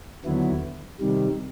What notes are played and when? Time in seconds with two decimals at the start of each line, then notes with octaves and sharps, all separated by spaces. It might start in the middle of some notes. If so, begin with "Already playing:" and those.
0.24 D#2 D3 F#3 B3 E4
1.00 C3 D#3 G3